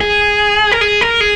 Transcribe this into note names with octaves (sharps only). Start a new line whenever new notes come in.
G#4
A#4
G#4
A#4
G#4